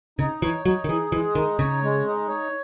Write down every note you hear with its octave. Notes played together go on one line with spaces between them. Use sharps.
C#3 D#4
E3 C#5
F#3 D#4
D#3
E3 G#4
E3 G#3
D#3 D#4
C#3 C#5
G#3
D#4
C#5